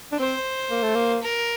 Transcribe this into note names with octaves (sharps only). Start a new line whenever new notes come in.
D4
C4 C5
A#3
A3
A#3
A#4